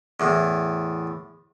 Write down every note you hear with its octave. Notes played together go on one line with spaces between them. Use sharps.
E2 A2